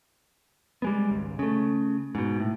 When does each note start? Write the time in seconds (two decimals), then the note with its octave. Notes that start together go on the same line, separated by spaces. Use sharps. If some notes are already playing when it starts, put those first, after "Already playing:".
0.82 G3 G#3 B3
1.10 G#1 C#2
1.39 C#3 A3
2.15 G#2 B2
2.40 A2